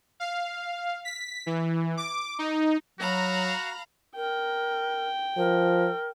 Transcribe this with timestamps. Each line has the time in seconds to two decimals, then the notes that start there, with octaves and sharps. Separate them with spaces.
0.20 F5
1.05 B6
1.46 E3
1.97 D6
2.39 D#4
3.00 F#3 F#4 F5 A#5 B5
4.16 A#4 G5
5.37 F3 A#4